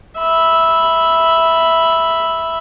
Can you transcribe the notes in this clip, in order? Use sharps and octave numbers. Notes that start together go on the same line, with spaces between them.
E5 B5